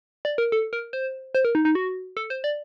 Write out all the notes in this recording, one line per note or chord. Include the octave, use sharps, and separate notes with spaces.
D5
A#4
A4
A#4
C5
C5
A#4
D#4
D#4
F#4
A4
C5
D5